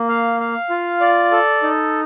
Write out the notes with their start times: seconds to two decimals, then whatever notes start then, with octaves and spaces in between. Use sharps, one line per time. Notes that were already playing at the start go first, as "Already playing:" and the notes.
Already playing: A#3
0.09 F5
0.40 F5
0.70 F4
1.01 D5
1.32 A4
1.63 D#4